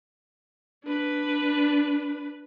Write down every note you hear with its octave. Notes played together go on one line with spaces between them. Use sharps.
D4 B4